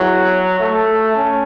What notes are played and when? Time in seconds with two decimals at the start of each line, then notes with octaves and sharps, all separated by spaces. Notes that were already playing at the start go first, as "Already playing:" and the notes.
Already playing: E2 E3 F#3
0.60 A3
1.15 C#4